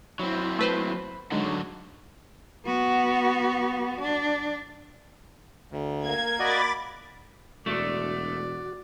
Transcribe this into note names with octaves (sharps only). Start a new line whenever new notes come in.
F#3 C4 E4 B5
A3 B4 C5
D3 F#3 G#3 D#4 C#5
B3 F#4
D4
D2
A#3 G#6
F#4 D5 D#5 B5 D6 A6
E1 A3 D4 F#4 D5